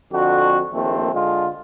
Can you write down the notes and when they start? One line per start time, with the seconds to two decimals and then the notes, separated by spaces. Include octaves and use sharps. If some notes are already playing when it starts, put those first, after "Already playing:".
0.13 F2 D3 F#4
0.73 A#1 D#2 A3 C4
1.13 D3 G#3 F4